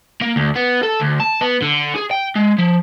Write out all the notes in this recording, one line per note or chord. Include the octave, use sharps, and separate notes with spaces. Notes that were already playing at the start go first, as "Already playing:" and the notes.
A#3
D2
B3
A4
D2
A5
B3
D3
G#4
G5
G#3
F3